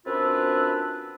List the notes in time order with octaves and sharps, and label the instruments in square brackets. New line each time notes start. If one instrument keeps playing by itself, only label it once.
[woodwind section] F#2 C4 D4 F4 B4 E5